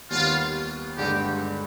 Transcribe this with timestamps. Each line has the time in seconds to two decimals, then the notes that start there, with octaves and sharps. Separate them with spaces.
0.10 D#2 D#3 G3 B3 F4
0.97 G2 D3 G#3 D#4 G4